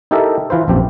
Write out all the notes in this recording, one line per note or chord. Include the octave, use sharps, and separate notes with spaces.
D#4 E4 G4 A4 A#4 E5
E3 F4 B4 C5
A#1 F#2 C4 G4